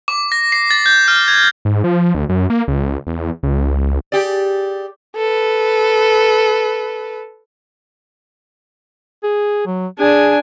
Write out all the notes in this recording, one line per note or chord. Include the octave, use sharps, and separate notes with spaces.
D6
A#6
C7
A6
G6
F6
G#6
G#2
F3
D2
F#2
A#3
C#2
E2
C#2
G4 G#4 D5
A4 B4
G#4
F#3
D4 G#4 G#5